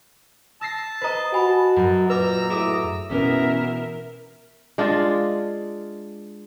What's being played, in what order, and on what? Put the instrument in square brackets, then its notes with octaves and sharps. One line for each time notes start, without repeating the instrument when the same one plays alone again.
[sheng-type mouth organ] A5 [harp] E6 A#6 C7
[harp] B4 D#5 [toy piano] C5 A#5
[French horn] F#4 [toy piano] F#5 G#5 B5
[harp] F#2
[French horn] A#2 [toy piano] B4 D6 [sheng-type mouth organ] A#5 E6
[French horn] A2 [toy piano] G#4 [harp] E5 D6 D#6
[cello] B2 E5 [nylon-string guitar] E3 B3 C#4 [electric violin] A#4
[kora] G#3 D4 F4